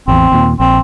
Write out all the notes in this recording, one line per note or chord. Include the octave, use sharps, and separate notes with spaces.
A1 E2 C4
D#2 A#2
A#1 C4